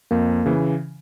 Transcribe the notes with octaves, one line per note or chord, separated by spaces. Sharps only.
F2 A#3
C#3 E3